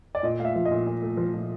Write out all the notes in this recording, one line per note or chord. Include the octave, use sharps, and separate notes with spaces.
D5
A#2 D#5
A3 F5
E5
F3
D#5
A#2
A#2
A3
F3
A#2